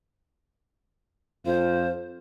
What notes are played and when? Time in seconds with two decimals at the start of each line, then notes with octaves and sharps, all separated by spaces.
1.46 F2 F4 C5